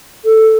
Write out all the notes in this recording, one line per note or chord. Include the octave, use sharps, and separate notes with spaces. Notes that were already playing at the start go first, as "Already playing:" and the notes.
A4